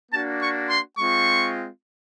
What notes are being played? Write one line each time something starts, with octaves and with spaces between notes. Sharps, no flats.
A#3 D4 F#4 A5
C#6
C6
G#3 C4 F4 C#6